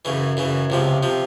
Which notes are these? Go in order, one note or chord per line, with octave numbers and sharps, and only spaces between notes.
F#2 C#3 E3
F#2 C#3 E3
C#2 C3 F3
C3 F3